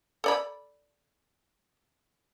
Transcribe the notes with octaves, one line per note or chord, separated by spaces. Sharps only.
A4 D5 B5